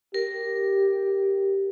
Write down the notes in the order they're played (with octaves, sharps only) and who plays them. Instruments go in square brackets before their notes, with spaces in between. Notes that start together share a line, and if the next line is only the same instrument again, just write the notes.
[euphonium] G4 [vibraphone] A#4